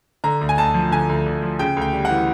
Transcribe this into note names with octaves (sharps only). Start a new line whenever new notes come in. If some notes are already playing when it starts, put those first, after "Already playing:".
D3 A#5
D2
G#5
D2 A5
F3
D3 G#5
D2
D2
F3
C#3 G5
D2 G5
G3
F#5
E3